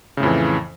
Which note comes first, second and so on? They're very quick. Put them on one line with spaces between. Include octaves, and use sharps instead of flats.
C#3 A2 F2 E3